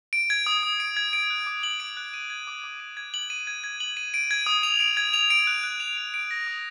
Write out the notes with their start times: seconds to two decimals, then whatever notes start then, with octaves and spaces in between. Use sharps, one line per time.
0.13 D7
0.30 G#6
0.46 D#6
0.63 D#6
0.80 D7
0.97 G#6
1.13 D7
1.30 F#6
1.47 D6
1.63 F#7
1.80 D7
1.97 F#6
2.14 D#7
2.30 G#6
2.47 D6
2.64 D6
2.80 D#7
2.97 G#6
3.14 F#7
3.30 D#7
3.47 G#6
3.64 G#6
3.80 F#7
3.97 D#7
4.14 D7
4.31 G#6
4.46 D#6
4.63 F7
4.80 D7
4.97 G#6
5.13 F7
5.30 D7
5.47 F#6
5.64 F#6
5.80 F7
5.97 D7
6.14 D7
6.31 A#6
6.47 D#6